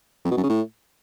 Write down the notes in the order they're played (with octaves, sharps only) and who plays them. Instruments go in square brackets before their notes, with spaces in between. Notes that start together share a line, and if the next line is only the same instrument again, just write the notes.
[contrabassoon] F2
B2
F#2
C#3
A2